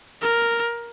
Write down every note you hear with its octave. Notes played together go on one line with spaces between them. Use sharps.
A#4